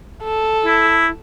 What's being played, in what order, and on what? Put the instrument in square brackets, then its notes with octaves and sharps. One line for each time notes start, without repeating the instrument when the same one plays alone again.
[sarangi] A4
[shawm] E4